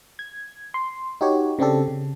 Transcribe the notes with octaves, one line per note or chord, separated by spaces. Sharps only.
G#6
C6
D#4 F#4 G4 C#5
C#3 C4 D4 G4 A4
C#3